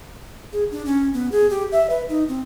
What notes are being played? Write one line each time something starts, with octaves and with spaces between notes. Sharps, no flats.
G#4
D4
C#4
B3
G#4
G4
E5
B4
D#4
C4